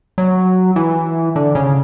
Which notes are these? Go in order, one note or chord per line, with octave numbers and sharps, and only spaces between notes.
F#3
E3
D3
C#3